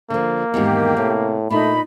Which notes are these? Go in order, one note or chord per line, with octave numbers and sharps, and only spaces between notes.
D3 F3 A#3
E2 G#2 D#3 G4
A2 C3
A#2 A3 D4 D#4 B5